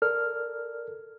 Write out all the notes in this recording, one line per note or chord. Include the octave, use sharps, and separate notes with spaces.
A4 A#4 D5 F6